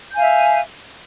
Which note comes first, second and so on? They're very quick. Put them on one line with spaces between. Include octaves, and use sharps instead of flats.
G6 G#5 F5 E5